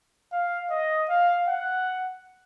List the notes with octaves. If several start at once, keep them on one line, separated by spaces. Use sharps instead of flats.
F5
D#5
F5
F#5